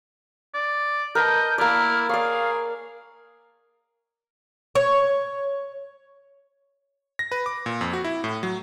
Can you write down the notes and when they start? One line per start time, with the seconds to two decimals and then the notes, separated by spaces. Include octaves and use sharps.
0.54 D5
1.15 A#4 B4 D#5 A5 G6
1.58 A#3 E4 D5 F6
2.09 G#4 C#5 D5 F5
4.75 C#5
7.19 A#6
7.32 B4
7.46 D6
7.66 A#2
7.81 F2
7.93 F#4
8.04 E4
8.24 A2
8.43 F#3